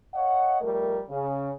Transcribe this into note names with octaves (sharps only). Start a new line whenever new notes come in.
C#5 D#5 F5 F#5
F2 G3 A3 A#4
C#3